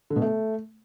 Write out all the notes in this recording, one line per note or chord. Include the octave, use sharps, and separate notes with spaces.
D3
B2
A3